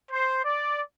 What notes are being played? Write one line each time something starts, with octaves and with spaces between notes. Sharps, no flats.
C5
D5